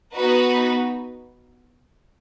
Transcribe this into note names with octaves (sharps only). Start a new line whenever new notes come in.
B3 D#4 F#4 B4